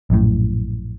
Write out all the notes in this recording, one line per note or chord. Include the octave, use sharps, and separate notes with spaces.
A#1 F#2 A2